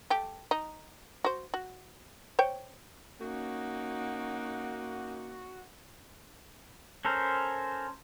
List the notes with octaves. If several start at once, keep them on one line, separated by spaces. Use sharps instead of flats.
A3 G4
D#4
F#4 C5
F#4
C5 C#5 G5
A#3 C#4 D#4 F#4 F#5
C#4 A4 A#4 C5